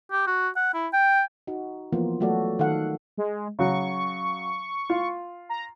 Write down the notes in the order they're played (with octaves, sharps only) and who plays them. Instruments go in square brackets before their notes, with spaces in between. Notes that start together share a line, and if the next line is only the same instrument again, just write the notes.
[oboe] G4
F#4
F#5
E4
G5
[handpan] D#4 F#4
E3 F3 A#3 B3 F4
F#3 A3 F#4 A4 D5
D#3 A4 F5 F#5
[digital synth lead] G#3
[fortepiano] C#3 F#3 [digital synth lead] C#6
[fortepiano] F4
[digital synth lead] A#5